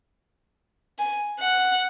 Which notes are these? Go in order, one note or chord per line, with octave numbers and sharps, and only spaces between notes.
G#5
F#5